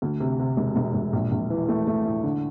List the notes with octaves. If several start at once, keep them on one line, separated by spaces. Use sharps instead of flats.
D2
C3
C3
E1
E1
E1
A#1
A#1
E3
A3
A3
A2
D3